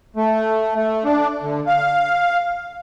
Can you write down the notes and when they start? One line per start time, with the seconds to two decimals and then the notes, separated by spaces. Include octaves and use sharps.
0.16 A3
0.75 A3
1.05 D4
1.43 D3
1.67 F5